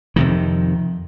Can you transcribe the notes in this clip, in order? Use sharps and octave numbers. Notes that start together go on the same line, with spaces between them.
F2 C3 D#3